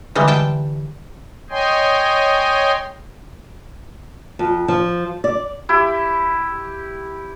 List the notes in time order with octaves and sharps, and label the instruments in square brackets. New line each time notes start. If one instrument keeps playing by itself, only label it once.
[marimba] D3 E5 [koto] E3 G3 G#3
[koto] G5 A5
[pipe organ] C#5 D#5 G5 G#5 C6
[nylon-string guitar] F2
F3
D5
[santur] E4 G4